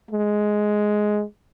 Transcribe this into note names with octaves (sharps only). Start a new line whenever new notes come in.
G#3